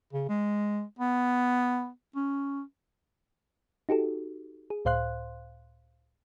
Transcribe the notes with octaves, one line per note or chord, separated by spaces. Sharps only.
C#3
G#3
B3
C#4
D#4 F#4 G4 A4
G#4
C#2 A2 C5 F5 C6 F#6